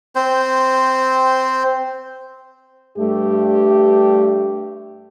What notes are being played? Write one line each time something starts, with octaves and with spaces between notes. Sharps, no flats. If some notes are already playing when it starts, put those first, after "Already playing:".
C4 C5
G2 A3 G4